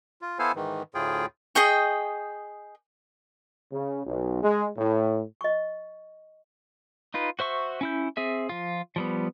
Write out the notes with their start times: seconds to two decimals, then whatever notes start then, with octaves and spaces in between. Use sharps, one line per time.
0.22 F4
0.39 B3 E4 A4 C5 F5 G#5
0.56 G#2 D#3 E3
0.95 D2 A2 F4 G#4 G5
1.55 G#4 D#5 G5 C#6
3.73 C#3
4.06 B1
4.43 G#3
4.78 A2
5.41 D#5 C#6
7.14 D#4 F4 B4
7.39 F#4 C5 E5 C#6
7.81 C#4 E4 G6
8.17 C4 G#4 E5
8.49 F3 F4
8.96 F3 G3 B3